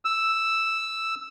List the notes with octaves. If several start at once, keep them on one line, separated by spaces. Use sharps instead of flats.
E6